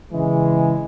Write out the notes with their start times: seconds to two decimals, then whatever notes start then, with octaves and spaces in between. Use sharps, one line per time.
0.11 C#3 E3 G#3